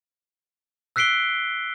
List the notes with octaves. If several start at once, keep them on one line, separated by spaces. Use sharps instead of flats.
E6 F#6 B6 C7 D7 G7